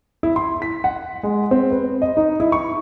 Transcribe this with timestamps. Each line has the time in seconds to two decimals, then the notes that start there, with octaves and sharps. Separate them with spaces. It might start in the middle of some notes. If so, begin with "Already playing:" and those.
0.23 E4
0.36 C6
0.62 B6
0.84 F#5
1.23 G#3
1.51 C4
1.71 B4
2.02 D#5
2.17 D#4
2.40 E4
2.52 C#6